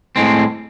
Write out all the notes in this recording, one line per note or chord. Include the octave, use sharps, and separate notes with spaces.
A2 G#3 C4